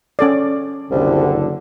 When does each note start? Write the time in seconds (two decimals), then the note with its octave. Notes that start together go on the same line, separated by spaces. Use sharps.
0.19 C#4 A4 D5
0.91 F#1 C2 D3